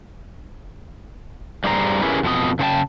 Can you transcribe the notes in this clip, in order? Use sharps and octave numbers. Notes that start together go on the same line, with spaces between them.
G2 G3 G4 G#4 C5 A#5
C#4 E4 G4 G#4 A#4 B4
F2 B2 E4 D#5
C#3 A4 C5 G5 A5